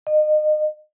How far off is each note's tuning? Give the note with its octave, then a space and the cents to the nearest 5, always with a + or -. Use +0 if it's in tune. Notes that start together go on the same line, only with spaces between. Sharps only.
D#5 -30